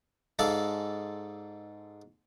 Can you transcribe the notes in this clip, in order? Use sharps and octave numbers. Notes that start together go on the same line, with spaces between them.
G#2 G#3 A4 D5 F5